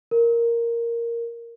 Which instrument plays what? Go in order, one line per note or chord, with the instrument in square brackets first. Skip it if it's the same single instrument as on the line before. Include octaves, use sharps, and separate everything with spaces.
[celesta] A#4